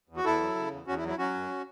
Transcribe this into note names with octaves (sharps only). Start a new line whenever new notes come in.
E2
F#4
E2 E4 A4
F#3
C#3
E2
E2 C#4 F#4
E4
F#3
E4
F#3 C#4 F#4
F#2